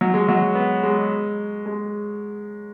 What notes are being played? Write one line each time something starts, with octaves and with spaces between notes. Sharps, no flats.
F#3
G#3
F#3
B3
G#3
G#3